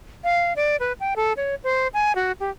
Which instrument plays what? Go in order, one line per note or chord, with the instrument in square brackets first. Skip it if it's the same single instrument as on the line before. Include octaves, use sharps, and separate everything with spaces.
[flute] F5
D5
B4
G5
A4
C#5
C5
G#5
F#4
G4